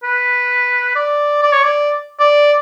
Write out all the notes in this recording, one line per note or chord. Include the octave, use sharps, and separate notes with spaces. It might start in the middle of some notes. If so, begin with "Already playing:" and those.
B4
D5
D5
C#5
D5
D5